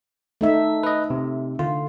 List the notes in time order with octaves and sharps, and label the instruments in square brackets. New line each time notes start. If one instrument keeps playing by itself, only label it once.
[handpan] A3 D#4 E5
[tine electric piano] B4 D#5
C3
[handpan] D3 [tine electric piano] F4